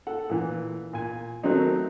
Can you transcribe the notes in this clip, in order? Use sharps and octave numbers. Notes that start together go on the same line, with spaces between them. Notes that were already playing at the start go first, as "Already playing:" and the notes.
A4 F#5
A#2 E3
A#2 G#5
D#3 F#3 A3 C4 D#4